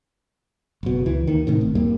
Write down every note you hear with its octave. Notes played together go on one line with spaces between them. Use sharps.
F#1 B2
C#2 E3
D#2 D#3
A2 C3 D#3
G1
E2 G2 G3 A#3